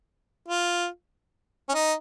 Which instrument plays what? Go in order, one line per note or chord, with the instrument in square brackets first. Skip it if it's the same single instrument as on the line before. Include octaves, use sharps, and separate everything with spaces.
[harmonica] F4
C#4
D#4